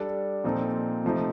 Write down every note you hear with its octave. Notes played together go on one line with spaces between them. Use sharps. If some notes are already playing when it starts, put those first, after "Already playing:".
Already playing: G3 D4 A4
A#2 F3 C4 D#4 A4
C3 F3 A3 D#4